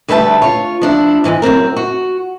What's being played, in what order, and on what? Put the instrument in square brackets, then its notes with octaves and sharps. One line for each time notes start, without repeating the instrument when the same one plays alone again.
[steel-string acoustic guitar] D2 G3 B4 E5 F#5 A5
F4 C#5
F3 D4 E4
G#2 E3 F#3 G#3
F#2 A#2 C4 A#4
F#4